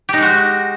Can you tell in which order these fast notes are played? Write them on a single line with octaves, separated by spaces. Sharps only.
G4 D#4 G#3 F#4